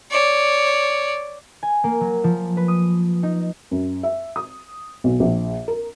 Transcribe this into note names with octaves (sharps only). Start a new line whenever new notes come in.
C#5 D5
G#5
A#3
F#3
F3
B4
D#6
D#4
F#2
E5
D#6
B1
A#1
A#4